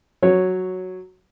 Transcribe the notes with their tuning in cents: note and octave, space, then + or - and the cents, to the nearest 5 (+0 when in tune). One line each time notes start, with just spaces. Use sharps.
F#3 +0 C#5 -5